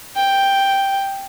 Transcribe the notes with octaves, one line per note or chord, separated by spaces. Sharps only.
G5